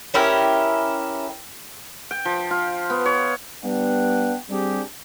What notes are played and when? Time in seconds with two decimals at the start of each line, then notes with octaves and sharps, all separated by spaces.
0.14 C#4 E4 G4 A#4
2.11 G5
2.25 F3
2.51 F4
2.90 B3
3.06 C#5
3.64 G3 B3 D4 F#5 G5
4.50 G3 C4 D4 G4 G#4